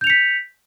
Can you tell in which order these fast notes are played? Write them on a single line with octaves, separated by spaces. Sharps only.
G6 F7 C#7 B6